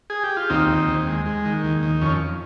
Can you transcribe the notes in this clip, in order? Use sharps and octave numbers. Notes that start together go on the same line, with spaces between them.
G#4
G4
F4
D#2 C4 D#4
D#2
D#2
G#3
G#3
D#3
D#2
D#3
F2 C#4